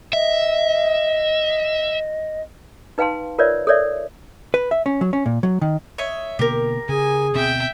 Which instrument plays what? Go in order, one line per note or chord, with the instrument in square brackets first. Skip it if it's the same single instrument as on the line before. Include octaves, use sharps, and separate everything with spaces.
[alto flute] D#5 [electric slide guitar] E5
[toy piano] D#4 B4 F5 G5 A5 C6
F4 A#4 B4 C#5 D5 E5
A4 A#4 C#5 D5 E5
[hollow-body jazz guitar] B4
E5
C#4
F#3
C#4
A#2
F#3
D#3
[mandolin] C#5 D#5 E5
[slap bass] B2 D3 A#3 [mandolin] G4 A#4
[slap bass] C#3 [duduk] G#4 [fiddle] G#5
[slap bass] D2 B2 C4 [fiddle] E5 G5